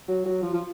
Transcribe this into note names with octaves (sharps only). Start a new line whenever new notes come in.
F#3
F#3
F3
F3